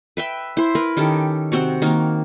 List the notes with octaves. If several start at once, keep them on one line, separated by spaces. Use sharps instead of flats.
B4 E5 G5
E4 C5
A#4 B4 B5
D#3 C#4 G4 A4
C3 C4 F#4 C#6
D#3 A#3